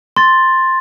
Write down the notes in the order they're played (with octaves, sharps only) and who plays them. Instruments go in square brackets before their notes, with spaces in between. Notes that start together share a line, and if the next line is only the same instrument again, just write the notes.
[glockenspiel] C6 A6